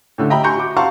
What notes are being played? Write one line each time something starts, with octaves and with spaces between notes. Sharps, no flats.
A2 D3 A3
D#5 E5 G5 A#5 B5
G#5 A#5 C6 C#6 G6 C#7
F#4 D6
F5 F#5 A5 A#5 C6 C#6